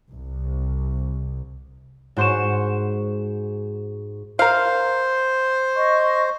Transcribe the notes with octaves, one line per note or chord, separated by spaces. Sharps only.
C2
G#2 F#4 C5 C#6 C#7 E7
A#4 C5 F5
D#5 C#6